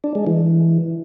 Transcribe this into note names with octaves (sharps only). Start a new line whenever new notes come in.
D4
G#3
E3